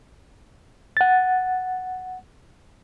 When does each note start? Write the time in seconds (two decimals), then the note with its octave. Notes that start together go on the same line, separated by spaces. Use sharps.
0.97 F#5 A6